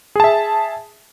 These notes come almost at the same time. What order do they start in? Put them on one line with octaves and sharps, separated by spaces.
G#4 A5 E5